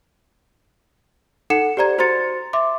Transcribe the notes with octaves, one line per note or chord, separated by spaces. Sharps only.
D#4 A4 F#5 C#7 E7
G4 C5 D5 A#5 G#6
F#4 C5 A#5 C6 A6 C#7
E5 C6 D6